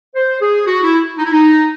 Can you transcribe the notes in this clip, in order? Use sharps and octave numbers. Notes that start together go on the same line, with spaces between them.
C5
G#4
F#4
E4
D#4
E4
D#4